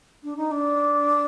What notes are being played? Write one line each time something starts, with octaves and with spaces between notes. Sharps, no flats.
D4
D#4
D4